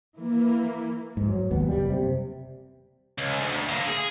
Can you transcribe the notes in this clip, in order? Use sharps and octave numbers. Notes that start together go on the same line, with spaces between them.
E3 A#3
G#2
F#3
G#1 D#2 B3
F#1 G3
C3
C#2
D2
D3 A#3
G#4